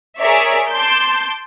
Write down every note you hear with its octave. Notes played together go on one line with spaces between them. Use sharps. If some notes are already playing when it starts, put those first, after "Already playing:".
G#4 A#4 C#5 D5 E5
A5 C6 D6 G6